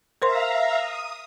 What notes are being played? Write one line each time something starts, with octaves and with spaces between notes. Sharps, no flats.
A#4 C5 E5 F5 A#5 C6
D#6